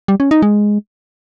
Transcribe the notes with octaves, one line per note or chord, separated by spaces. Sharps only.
G3
C#4
D#4
G#3